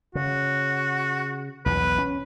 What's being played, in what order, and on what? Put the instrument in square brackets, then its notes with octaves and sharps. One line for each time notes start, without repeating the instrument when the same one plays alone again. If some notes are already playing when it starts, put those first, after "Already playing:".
[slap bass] C#3 [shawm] F#4
[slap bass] B1 E2 B2 [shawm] B4
[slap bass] C#4